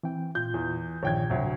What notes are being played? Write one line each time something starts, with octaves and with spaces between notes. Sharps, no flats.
E3 C4 G5
A#2 F4 G6
E2
A#1 G2 D#3 C#5 G5 G#6
D2 A2 C3 F#3